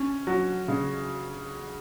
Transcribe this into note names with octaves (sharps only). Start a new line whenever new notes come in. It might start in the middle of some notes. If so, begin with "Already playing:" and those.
Already playing: C#4
F#3
C#3